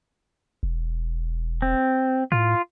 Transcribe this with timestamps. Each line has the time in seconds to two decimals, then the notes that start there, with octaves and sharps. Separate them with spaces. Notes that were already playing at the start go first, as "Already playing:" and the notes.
0.63 E1
1.62 C4
2.32 A2 F4